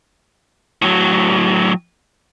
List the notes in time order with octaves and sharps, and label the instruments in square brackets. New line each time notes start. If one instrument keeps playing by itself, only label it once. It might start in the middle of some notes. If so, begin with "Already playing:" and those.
[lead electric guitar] A2 F#3